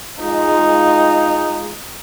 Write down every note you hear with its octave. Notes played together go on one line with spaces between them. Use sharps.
G#3 D#4 F4